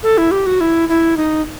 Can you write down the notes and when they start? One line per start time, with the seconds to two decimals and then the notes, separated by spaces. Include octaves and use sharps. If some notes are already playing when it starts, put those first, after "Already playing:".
0.03 A4
0.18 E4
0.31 G4
0.46 F#4
0.61 E4
0.89 E4
1.17 D#4